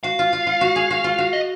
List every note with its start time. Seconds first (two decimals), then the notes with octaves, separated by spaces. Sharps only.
0.03 F#4 F5
0.19 F4
0.33 F4
0.47 F4
0.61 F#4
0.76 G#4
0.91 F#4
1.04 F4
1.18 F#4
1.33 D#5